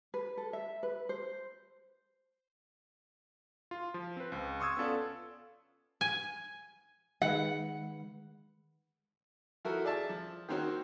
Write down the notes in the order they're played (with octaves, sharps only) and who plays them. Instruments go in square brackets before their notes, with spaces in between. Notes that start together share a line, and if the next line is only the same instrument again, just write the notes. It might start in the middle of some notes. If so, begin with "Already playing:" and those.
[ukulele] B4
A4
E5
B4
C5
[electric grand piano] F4
F3
C4 B4
C#2
C6 C#6 D#6 E6 G#6
B3 C#4 F4 A4 D5 F5
[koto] G#5
[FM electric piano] D#3 G#3 B4 [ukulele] F#5
[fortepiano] F3 E4 F#4 A4 A#4
G#4 D5 E5 A5
F3
D#3 A#3 C4 F#4 C#5